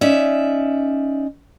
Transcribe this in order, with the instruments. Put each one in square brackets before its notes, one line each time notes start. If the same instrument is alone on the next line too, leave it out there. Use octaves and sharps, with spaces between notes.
[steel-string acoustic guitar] C#4 D#4 D5 E5